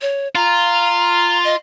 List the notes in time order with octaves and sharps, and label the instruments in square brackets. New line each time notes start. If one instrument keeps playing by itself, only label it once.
[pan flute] C#5
[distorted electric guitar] F4 [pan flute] A#5
[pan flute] D#5